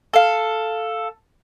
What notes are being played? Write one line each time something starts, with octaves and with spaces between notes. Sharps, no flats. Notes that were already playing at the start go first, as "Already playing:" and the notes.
A4 F5